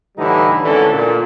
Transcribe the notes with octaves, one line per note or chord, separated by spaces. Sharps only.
A2 D3 E3 G3 D#4 E4
G#1 D2 D3 E3 C#4 A4
A#2